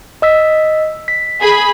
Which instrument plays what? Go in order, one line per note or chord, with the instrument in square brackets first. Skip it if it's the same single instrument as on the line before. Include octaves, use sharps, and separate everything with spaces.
[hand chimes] D#5 E6 B6
B6
[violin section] G#4 B5